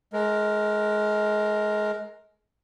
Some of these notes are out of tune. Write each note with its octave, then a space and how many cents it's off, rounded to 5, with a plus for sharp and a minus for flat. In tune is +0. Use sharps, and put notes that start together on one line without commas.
G#3 +30 A#4 +0